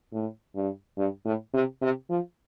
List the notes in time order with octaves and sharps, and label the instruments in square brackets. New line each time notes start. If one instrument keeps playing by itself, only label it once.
[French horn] A2
G2
G2
A2
C3
C3
F3